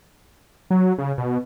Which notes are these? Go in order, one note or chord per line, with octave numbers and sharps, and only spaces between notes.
F#3
C#3
B2